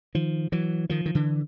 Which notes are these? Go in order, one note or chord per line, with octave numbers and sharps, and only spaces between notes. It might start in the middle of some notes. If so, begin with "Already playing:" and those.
D#3 F3
E3 F#3
D#3 F3
D#3
D3 E3